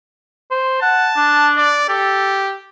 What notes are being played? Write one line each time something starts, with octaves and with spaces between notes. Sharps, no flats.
C5
F#5 A5
D4
D5
G4 A4